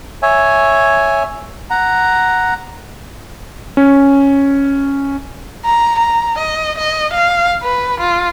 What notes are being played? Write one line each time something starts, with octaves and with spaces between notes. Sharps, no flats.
C#5 E5 G#5
F#5 A#5
C#4
A#5
A#5
D#5
D#5
F5
B4
F4